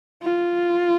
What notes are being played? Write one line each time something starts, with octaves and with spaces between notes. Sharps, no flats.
F4